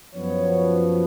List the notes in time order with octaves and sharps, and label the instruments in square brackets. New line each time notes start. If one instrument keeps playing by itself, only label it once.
[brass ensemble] F#2 F3 B3 C#5